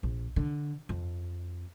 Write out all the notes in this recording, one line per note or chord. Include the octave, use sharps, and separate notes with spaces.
A#1
D3
F2